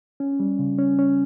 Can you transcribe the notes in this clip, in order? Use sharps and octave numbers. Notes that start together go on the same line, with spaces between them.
C#4
G3
C#3
C#4
C#4